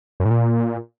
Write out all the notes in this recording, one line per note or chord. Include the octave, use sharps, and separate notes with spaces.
F#2
A2
A#2